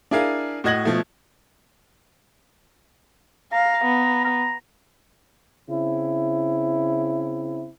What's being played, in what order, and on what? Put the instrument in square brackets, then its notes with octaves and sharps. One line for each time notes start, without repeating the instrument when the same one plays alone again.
[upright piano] D4 E4 G#4 A#4 F5 G#5
A2 F#4 D#5 G#6 A#6 F#7
B2 F3 A3
[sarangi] F5 [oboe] A#5
[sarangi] B3
[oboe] A#5
[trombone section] C#3 C4 E4